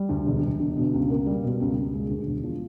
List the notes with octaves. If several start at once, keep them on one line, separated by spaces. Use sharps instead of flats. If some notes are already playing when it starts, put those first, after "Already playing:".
Already playing: G3
D2
E1
E1
D3
B2
C#2
A#3
G3
B2
C#2
C#2
G#3
D2
E1
F3